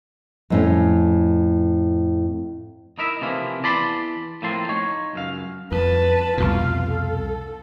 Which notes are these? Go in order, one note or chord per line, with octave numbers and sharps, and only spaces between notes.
F2 A2 C#4
D#4 E4 A#4 E5
C3 E3 F3 A#3 E4 A#4
E2 E3 D5 A5 B5 C6
A2 F3 A#3 C4 A5 C6
D#4 C#5
C#2 F#2 F5
F2 B4 A5
C2 F2 B2 F4 F5
A4